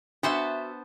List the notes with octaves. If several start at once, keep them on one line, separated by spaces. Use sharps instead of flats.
B3 D4 F#4 C5 E5 A5